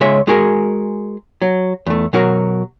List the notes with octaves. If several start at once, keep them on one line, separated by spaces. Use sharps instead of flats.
C#2 G#3 C#5 E5
G#3 F#4 G#4 A#4
F#3
E2 A3
B2 F#3 F#4 A#4